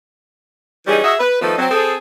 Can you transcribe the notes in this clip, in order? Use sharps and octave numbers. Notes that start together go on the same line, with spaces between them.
E3 G3 C#4 D#4 G#4
F#4 G#4 D#5 E5
B4
D#3 F3 A3 D#4 A4 B4
F#3 C4
C4 G#4 A4